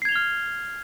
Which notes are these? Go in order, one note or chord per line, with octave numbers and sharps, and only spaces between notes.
F6 G#6 C7 F7 G7